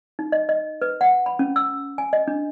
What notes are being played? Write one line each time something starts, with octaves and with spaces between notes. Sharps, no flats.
D#4
D#5
D#5
B4
F#5
B5
C#4
E6
G#5
D#5
D4